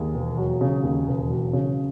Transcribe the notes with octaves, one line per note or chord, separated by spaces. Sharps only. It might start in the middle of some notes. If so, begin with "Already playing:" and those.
Already playing: D#2 G#4
E1
F#3
C#3
D#2
E1
F#3
C#3